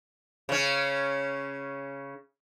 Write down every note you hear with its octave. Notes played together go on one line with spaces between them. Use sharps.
C#3 C#4